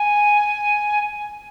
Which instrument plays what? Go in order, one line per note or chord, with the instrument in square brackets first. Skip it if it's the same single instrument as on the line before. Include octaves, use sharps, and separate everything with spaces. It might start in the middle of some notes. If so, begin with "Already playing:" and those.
Already playing: [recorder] G#5